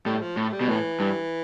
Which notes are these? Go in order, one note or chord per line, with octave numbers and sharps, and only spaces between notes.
A2 G3
F3
A2 A3
G3
B2
A2 E3
G2